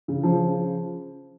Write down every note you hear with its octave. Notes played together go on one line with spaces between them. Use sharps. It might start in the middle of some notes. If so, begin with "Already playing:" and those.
C#3
C#3 F3